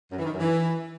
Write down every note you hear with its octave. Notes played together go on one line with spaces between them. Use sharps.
F#2
E3
D#3
F#2
E3